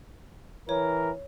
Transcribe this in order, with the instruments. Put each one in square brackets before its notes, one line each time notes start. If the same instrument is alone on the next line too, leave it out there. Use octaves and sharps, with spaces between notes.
[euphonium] E3 [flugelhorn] A#4 [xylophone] C#5